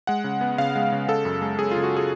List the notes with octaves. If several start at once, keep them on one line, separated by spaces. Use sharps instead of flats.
G#3 F#5
C#3
B3
C#3 F5
G#3
C#3
C#3 A4
F#2
G#3
F#2 G#4
C#3 F4
F#4
G#4